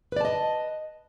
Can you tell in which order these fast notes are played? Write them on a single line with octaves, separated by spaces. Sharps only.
B4 D5 A5 D#5